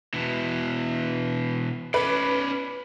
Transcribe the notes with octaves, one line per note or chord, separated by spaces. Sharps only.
B2 E3
C#4 B4 D5